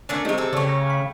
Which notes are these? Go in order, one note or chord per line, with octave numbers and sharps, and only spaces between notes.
A3 A#3 C#4 D4
C3 F#3 G#3 A3 D#4
G#4 A4
C#3 A3 G4 A4 C#5 D5
C#5 A#5
F5 B5